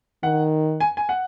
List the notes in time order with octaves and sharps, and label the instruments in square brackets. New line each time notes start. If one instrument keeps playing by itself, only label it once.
[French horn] D#3 [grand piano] F#5
[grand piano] G#5
G#5
F#5